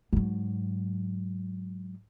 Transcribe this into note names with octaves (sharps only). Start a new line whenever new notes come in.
G#2 F#3